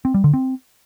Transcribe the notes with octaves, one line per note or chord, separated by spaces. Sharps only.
C4
G3
D3
C4